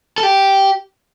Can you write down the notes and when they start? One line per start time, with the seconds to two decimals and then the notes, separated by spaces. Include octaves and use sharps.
0.18 A4
0.23 G4